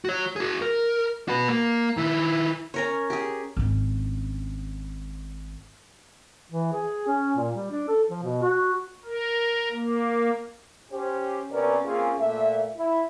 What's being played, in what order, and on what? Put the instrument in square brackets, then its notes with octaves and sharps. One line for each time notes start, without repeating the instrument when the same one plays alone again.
[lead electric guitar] F#4 C#5
F#4 G#4
A#4
F#4 B4
A#3
D#3 E4
[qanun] C#4 A#4 C#5
G4 G#4
[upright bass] G#1 C#4
[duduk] E3
G#4
C#4
A#2
G3
D4
A4
F3
B2
F#4
[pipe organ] A#4
A#3
[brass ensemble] C#4 G4 C5
C3 B3 C#4 A#4 B4 D5
A#3 C4 C#4 F4 G#4
A#2 A3 E5
E4